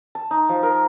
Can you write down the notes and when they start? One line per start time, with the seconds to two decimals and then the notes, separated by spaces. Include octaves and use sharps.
0.15 A5
0.31 D#4
0.49 F3
0.63 A#4